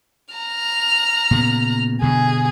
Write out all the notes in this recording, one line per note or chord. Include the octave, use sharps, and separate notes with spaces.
A#5 F6
A#2 C#3 B3
G2 B2 D3 G#4